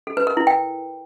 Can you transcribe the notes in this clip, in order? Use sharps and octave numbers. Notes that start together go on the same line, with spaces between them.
A4
B4
A#4
E4
G5